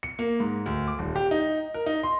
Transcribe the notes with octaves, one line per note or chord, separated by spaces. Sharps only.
C#7
A#3
G#2
D2
D6
D#1
G4
D#4
A#4
D#4
C6